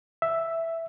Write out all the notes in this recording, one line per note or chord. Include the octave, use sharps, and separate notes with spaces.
E5